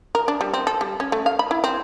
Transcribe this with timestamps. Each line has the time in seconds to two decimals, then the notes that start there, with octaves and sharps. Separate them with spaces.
0.15 A#4
0.28 D4
0.41 G3
0.54 C4
0.67 A4
0.81 G3
1.00 C#4
1.12 A3
1.26 F5
1.39 B5
1.51 E4
1.64 C4